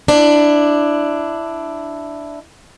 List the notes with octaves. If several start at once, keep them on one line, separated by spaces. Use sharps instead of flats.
D4 E4